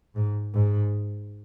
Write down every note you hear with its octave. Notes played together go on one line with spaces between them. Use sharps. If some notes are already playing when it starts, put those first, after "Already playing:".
G#2
G#2